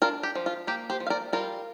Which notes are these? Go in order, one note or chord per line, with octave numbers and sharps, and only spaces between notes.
D4 F4 A#4
G4
F3
F4
A#3 G4
G4 C5
F3
F5
A#4 D5
G3 F4 A#4